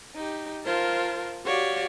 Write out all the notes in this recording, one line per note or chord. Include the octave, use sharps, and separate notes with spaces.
D#4 G4
F4 A#4 C5 A5
F#4 G4 C#5 D5 F5